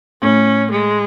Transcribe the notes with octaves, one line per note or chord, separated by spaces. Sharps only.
A2 C#4
G#3